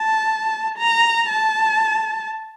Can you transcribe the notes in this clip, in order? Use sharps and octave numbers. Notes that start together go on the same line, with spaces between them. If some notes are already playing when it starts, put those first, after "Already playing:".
Already playing: A5
A#5
A5